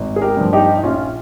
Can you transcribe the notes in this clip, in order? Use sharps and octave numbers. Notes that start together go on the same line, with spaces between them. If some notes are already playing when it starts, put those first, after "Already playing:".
Already playing: G#1
G#4
G4 A#4
G2 F3
D#4 G4
D#4
A#1 C#4 F4